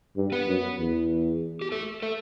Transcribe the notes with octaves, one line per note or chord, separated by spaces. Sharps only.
G2
B3 B4
F#2
E2
G4
A3 A4
A3 A4